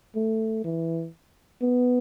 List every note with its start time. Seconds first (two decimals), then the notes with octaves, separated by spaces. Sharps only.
0.16 A3
0.64 E3
1.62 B3